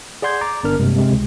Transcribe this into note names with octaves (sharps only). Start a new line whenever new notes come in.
G#4 D5 F#5 C6 G6 G#6
A#5 D6 A6
G1 B3 D4 A#4 F6
G2 C3 G#3 A#3
C3 G#3 C4
C#2